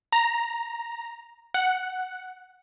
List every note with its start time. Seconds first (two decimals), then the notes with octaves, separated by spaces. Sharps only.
0.12 A#5
1.54 F#5